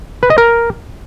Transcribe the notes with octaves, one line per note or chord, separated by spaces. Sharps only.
B4
D#5
A#4